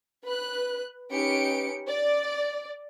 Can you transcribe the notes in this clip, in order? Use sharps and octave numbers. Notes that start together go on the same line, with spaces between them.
B4 F#6
C#4 D#4 G4 B4 C#7 D7
D5